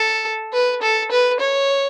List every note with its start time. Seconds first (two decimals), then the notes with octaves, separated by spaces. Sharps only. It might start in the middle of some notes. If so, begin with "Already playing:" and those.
Already playing: A4
0.53 B4
0.82 A4
1.11 B4
1.40 C#5